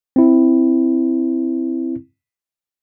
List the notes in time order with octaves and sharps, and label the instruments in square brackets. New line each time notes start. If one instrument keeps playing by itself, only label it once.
[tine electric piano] C4 E4